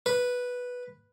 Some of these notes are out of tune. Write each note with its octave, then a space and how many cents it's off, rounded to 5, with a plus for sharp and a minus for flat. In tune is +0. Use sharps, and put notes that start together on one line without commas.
B4 -5